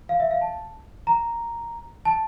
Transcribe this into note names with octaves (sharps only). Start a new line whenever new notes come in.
F5
E5
F5
A5
A#5
A5